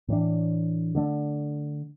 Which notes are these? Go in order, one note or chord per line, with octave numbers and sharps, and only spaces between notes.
A2 E3 D4
D3 A3 D4